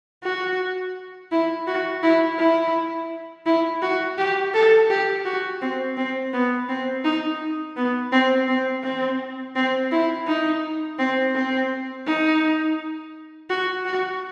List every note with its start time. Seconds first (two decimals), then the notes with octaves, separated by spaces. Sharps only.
0.24 F#4
1.32 E4
1.67 F#4
2.03 E4
2.39 E4
3.46 E4
3.82 F#4
4.18 G4
4.54 A4
4.90 G4
5.25 F#4
5.61 C4
5.97 C4
6.33 B3
6.69 C4
7.04 D#4
7.77 B3
8.12 C4
8.48 C4
8.84 C4
9.55 C4
9.91 E4
10.27 D#4
10.99 C4
11.35 C4
12.07 D#4
13.50 F#4
13.85 F#4